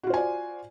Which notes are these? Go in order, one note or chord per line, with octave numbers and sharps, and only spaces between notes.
F4 F#4 C5 D5 G#5